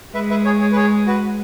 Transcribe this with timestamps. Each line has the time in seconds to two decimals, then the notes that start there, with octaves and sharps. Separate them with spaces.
0.14 G#3 B4 E5
0.30 B4 E5
0.45 G#4 C#5
0.61 G#4 C#5
0.72 B4
0.76 G#4 C#5
1.07 F#4 B4